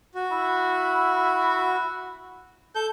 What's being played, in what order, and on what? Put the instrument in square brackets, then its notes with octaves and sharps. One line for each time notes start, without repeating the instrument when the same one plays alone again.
[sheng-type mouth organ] F#4
[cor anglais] E4
[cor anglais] A4 [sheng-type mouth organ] G6